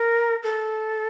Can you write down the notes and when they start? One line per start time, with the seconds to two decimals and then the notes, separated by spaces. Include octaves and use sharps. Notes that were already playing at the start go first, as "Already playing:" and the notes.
Already playing: A#4
0.43 A4